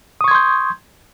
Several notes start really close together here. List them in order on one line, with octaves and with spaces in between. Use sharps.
D#6 C#6 G#6 C6 G6